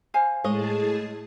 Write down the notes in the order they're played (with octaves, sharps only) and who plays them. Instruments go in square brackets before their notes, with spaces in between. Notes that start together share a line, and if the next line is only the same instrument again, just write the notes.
[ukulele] C5 F5 G#5
[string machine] A2 G#4 A5 [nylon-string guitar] G#3 C#5 D#5